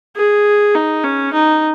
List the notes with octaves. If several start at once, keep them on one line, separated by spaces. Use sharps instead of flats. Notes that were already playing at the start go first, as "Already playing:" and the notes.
G#4
D#4
C#4
D#4